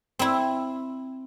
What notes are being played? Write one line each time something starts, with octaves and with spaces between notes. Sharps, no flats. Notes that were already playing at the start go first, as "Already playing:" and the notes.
C4 E4